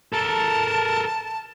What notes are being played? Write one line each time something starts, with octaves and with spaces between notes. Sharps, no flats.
A4 A#4 A5